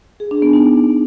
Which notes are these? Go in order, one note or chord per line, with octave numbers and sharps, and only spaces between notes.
G#4
D4
B3
D#4